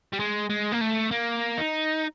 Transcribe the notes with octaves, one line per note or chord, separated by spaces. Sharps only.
G3
G#3
G#3
A#3
A3
A#3
D#4